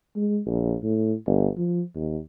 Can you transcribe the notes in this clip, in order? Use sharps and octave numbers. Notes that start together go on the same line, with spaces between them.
G#3
A#1
A2
G1
F3
D#2